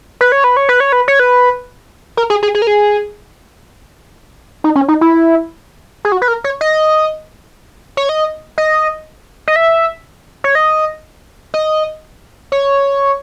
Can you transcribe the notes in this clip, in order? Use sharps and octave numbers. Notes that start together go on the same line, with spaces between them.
B4
C#5
B4
C#5
B4
C#5
B4
C#5
B4
A#4
G#4
G#4
G#4
A#4
G#4
D#4
C#4
D#4
E4
G#4
F#4
B4
A#4
C#5
D#5
C#5
D#5
D#5
D#5
E5
C#5
D#5
D#5
C#5